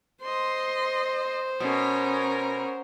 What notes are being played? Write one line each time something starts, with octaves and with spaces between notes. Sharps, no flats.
C5 D#5 C6
B2 C#4 A#4